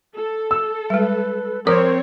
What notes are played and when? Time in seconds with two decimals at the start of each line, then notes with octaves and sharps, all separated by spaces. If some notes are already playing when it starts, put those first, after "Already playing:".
0.15 A4
0.51 E6
0.90 G3 G#3 B4
1.67 F3 C4 A#4 C5 C#5 D6